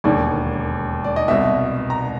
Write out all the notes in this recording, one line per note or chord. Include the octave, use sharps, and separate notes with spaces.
E1 D#2 D3 D5
D5
D#5
C2 B2 E5
A#5